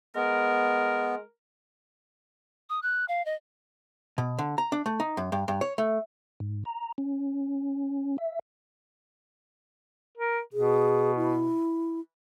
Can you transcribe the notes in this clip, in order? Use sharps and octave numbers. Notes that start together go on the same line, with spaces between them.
G#3 B3 A#4
D#6
F#6
F5
D#5
B2
D3
A#5
D4
A3
D#4
F#2
G2
G2
C#5
A3
G#2
A#5
C#4
E5
A#4
B2 G#4
E4